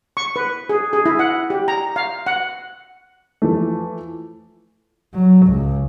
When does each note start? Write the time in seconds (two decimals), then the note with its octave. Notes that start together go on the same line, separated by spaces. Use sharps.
0.17 C#6
0.36 B4
0.69 G#4
0.93 G#4
1.06 E4
1.19 F#5
1.50 G4
1.68 A#5
1.96 F5
2.26 F#5
3.42 E3 F3 A3
5.14 F#3
5.47 C#2